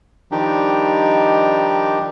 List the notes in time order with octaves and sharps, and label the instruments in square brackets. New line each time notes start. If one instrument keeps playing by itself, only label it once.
[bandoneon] D#3 F3 G3 D4 D#4 G4